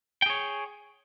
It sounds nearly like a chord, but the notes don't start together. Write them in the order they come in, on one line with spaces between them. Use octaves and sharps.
G5 G#4 C#5